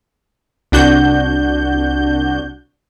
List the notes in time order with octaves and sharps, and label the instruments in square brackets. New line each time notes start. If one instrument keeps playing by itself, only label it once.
[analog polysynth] C2 D4 F#4 G6